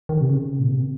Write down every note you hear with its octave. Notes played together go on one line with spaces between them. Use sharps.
D#3
C3
C#3
A#2
C3